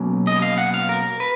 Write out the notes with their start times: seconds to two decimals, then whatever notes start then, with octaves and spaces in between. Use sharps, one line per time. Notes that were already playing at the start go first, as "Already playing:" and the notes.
Already playing: B2 F#3 A#3 C#4
0.27 D#5
0.42 F5
0.58 F#5
0.74 F5
0.89 A#4
1.20 B4